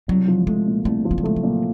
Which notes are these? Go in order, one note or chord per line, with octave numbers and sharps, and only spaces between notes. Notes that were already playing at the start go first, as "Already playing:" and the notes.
C2 F#3
F3
G#3 A3
A#2
C2 A3
F3
G#3
G3
G#3 A3
F#3
A#2